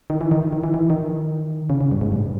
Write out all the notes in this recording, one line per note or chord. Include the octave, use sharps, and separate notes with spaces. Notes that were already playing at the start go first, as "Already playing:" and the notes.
D#3
E3
D#3
D#3
E3
E3
D#3
C#3
C#3
G2
G#2
G2